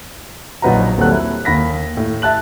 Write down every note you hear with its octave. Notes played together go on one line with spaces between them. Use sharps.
A#1 F#3 D#4 B4 F#5 A#5
D#2 F#3 G3 C4 A4 F#6
E4
D#2 B5 A#6 B6
A2
E5 A5 F#6 F#7